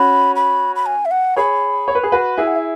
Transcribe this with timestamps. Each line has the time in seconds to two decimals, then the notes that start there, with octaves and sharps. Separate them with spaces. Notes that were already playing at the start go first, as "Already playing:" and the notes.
Already playing: C#4 F#4 B5
0.36 B5
0.76 B5
0.86 G#5
1.05 E5
1.11 F#5
1.37 G#4 C#5 B5
1.88 C#5
1.95 B4
2.03 G#4
2.12 F#4 B4
2.37 E4 G#4 G#5
2.47 F#5
2.56 E5